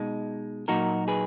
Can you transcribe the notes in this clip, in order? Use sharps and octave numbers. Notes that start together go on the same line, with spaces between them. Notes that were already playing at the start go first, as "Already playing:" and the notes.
Already playing: B2 G#3 D#4
A#2 F#3 A#3 D#4 F#4 A#4
G#4 B4